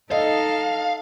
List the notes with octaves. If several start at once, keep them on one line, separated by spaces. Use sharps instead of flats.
D#4 A4 D#5 F5